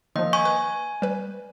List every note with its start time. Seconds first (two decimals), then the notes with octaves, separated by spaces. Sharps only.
0.16 D#3 F3 A#3 D#5
0.33 G#5 C#6
0.45 B4 G#5
1.02 G3 B4